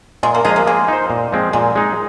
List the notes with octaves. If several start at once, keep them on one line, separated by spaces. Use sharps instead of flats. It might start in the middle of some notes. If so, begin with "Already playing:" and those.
A#2 G#3
A#3
F3 G#3 D#4 F4 G#4
A#3
G#3 A#3
D#4 C5
A#2
F3 G#3 C4
A#2 G#3
G#3 D#4